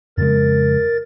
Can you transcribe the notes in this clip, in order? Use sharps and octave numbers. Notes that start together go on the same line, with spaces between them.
F2 C#3 G#3 A#4 A6